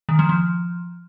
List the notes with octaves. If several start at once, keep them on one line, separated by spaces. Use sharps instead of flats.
D#3
F3
F3